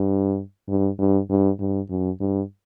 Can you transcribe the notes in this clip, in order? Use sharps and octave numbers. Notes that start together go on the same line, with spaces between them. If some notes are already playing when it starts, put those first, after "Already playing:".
Already playing: G2
G2
G2
G2
G2
F#2
G2